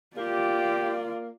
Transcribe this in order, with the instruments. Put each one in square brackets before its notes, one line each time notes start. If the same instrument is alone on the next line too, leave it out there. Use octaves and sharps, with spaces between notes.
[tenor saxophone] A#3 [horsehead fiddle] F4 D5 [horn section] G4